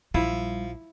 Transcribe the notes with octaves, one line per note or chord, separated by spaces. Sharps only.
A#1 F3 G3 E4